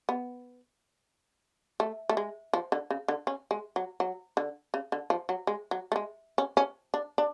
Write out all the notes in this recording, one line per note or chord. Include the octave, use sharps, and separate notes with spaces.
B3
A3
A3
G#3
F3
D3
C#3
D3
C#4
G#3
F#3
F#3
D3
C#3
D3
F3
F#3
G#3
F#3
A3
G#3
C#4
C#4
D4
D4